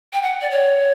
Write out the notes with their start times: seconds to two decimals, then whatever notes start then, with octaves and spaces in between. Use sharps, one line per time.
0.13 G5
0.23 F#5
0.41 D5
0.51 C#5